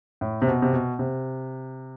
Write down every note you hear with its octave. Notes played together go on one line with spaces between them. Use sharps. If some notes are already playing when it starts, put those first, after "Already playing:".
A2
C3
B2
C3
B2
C3